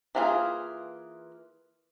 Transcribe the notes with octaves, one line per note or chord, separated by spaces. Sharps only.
E3 A#3 D4 F4 G#4